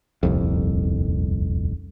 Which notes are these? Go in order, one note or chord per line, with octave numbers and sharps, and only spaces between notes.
D#1 C2 F2